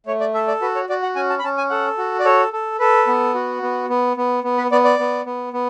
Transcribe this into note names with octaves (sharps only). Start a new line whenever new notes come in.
A3 C#5
D5
A4 E5
D5
F#4 B4
C#5
F#4 D5
F#5
C#4 G#5
A5
B5
C#4 A5
G#5
A4 F#5
F#4
D5
A4 C#5
A4
A4 B4
B3
F#4
B3
B3
B3
B3
B4
B3 D5
D5
B3
B3
B3